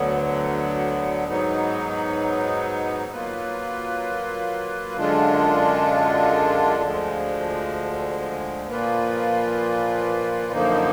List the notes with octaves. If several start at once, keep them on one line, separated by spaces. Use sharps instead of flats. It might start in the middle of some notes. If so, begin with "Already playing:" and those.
Already playing: D2 D3 F#3 B3
G#2 F#3 B3 D#4
F#3 A#3 F4 B4
F#2 D3 G#3 D4 F4
D2 D3 F3 G#3
A#2 F3 A#3 F4 B4
F#2 D3 F3 A#3 D#4